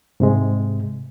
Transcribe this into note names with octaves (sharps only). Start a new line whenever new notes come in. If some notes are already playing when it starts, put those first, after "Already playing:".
G#2 C3 G#3